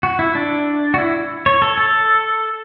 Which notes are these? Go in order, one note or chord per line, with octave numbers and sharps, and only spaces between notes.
F#4
E4
D4
F#4
E4
C#5
A4
A4